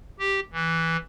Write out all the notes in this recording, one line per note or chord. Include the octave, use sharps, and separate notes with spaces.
G4
E3